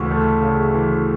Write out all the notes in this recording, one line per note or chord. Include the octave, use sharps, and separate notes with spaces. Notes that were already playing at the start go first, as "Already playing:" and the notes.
Already playing: D2 C#3 E3 C#6
A3
C#3
E3